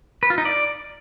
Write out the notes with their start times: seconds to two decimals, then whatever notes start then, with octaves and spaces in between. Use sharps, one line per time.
0.23 B4
0.30 F4
0.38 D#4
0.45 D5